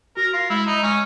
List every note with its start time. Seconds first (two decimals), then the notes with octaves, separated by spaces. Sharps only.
0.17 F#4 A#4
0.33 F4
0.50 G#3 E4
0.66 D#4
0.83 G#3 C#4